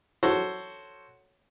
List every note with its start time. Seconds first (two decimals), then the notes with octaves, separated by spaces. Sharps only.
0.23 F#4 A4 C5 C#5 F#5